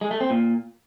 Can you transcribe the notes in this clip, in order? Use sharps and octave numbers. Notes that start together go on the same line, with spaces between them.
G#3
A3
C4
A#2